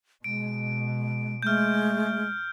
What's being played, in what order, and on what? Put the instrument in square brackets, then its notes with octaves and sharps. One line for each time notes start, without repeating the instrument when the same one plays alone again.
[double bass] B2 [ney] G#3 [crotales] D7
[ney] G#3 [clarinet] A3 [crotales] F6 G6